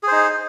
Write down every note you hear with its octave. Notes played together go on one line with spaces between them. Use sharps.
D#4 G#4 C5